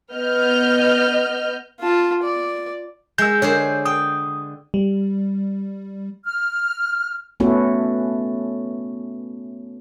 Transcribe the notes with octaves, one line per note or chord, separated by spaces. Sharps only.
B3 D#5 F6 G6
F4 A5
D5
G#3 E6 G6
D3 G#4 C5 C#5
G5 D#6
G3
F6
A3 B3 C#4 E4 F#4 A4